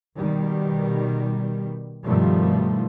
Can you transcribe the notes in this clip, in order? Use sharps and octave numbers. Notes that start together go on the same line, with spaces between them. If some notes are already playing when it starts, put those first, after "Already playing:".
B2 D#3 G3
G2 B2 D#3 F3 G3 A3